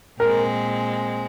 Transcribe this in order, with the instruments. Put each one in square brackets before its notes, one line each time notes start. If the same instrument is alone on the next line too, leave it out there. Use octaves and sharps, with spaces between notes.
[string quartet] A#2 G#3 C4 [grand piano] A#4